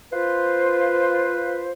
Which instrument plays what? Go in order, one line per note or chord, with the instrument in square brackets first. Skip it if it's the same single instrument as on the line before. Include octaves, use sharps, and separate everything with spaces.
[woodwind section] F4 B4 C5